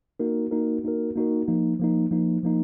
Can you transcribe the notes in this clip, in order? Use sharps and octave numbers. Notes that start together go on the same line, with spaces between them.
A#3 D#4 F#4 A#4
A#3 D#4 F#4 A#4
A#3 D#4 F#4 A#4
A#3 D#4 F#4 A#4
F3 A#3 D#4
F3 A#3 D#4
F3 A#3 D#4
F3 A#3 D#4